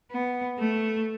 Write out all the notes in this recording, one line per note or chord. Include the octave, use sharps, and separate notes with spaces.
B3
A3